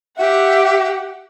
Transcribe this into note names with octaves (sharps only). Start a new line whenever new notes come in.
G4 E5 F#5